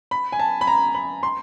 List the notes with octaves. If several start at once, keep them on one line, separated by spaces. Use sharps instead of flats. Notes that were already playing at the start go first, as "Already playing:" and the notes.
B5
G#5
A5
B5
A#5
B5
C6